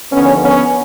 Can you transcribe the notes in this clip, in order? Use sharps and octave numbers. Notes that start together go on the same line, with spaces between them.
D#2 D3 F3 B3 C#4
B3 C#4